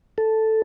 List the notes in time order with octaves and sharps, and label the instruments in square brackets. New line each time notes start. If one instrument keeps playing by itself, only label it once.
[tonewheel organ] A4